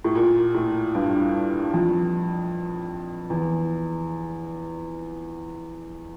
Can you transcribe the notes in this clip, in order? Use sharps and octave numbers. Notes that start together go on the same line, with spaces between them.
A2
A#2
A2
G2
F2
E2